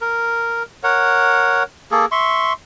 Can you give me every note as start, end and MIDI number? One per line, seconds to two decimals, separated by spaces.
0.01 0.63 70
0.84 1.63 70
0.84 1.63 73
0.84 1.63 78
1.91 2.06 58
1.91 2.06 68
1.91 2.06 69
2.12 2.53 76
2.12 2.53 84
2.12 2.53 85